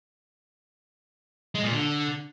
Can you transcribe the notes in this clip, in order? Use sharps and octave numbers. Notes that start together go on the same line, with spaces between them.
G#3
A#2
D3